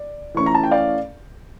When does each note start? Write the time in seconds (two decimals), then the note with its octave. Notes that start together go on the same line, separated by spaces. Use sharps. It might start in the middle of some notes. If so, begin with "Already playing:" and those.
Already playing: D5
0.34 E3 A3 C#4 C#6
0.46 A#5
0.54 A5
0.63 G5
0.71 D5 F5